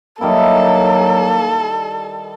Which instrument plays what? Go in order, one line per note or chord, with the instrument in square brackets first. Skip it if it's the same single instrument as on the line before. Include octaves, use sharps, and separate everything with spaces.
[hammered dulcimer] D#3 G3 E4 [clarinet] F#3 [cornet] A#3 [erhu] A4